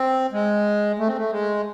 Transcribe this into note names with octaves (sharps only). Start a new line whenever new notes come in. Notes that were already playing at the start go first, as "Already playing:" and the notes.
Already playing: C4
G#3
A3
C4
A3
G#3